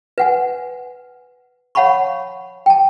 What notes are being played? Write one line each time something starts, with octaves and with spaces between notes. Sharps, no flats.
B4 F#5 G#5
C#5 F5 F#5 A5 B5 C#6
G5 A5